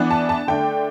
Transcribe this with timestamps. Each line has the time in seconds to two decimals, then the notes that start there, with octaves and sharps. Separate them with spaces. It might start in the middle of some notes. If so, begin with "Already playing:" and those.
Already playing: E3 B3 D4
0.11 A5
0.29 A5
0.47 D3 A3 D4 G5